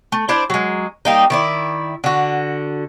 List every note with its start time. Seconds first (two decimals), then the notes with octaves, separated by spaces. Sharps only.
0.12 A3
0.29 D4 E4 C5 D5
0.50 F#3 G#3
1.05 G3 A#3 D#4
1.30 D#3 E4 D5
2.04 D3 F#4